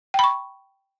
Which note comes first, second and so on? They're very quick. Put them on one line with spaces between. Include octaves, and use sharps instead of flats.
G5 B5 C#6